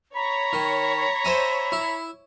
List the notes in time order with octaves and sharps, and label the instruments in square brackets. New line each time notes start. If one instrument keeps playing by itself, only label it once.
[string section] C#5 [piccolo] A#5 [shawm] B5
[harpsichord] D#3
C5 E5 G#5
E4